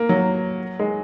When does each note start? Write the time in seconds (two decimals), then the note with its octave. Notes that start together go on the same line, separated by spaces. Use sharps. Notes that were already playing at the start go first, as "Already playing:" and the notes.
Already playing: A#3
0.09 F#3
0.79 G#3